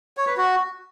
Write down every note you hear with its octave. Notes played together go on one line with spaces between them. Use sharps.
C#5
B4
F#4